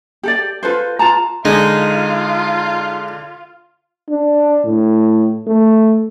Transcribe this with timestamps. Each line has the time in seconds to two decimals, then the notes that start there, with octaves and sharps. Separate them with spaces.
0.23 G4 A4 D5
0.63 F4 A4 B4 C5
0.99 F4 B4 A5 A#5
1.45 D3 G#3 D#4 F4
4.10 D4
4.65 A2
5.47 A3